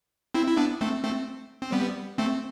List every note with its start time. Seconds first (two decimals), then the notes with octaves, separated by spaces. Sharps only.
0.34 C4 E4
0.47 E4
0.57 B3 D4
0.81 A3 C4
1.03 A3 C4
1.62 C4
1.72 G3 B3
2.18 A3 C4